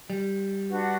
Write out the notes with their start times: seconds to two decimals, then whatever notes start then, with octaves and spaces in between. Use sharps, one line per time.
0.10 G3
0.69 D4 F#4 B4 F#5